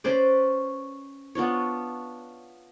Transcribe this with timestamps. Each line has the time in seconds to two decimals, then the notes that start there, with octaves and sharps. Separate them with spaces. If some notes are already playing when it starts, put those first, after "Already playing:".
0.04 C#4 B4 C5 D5
1.35 B3 D4 F4 C#5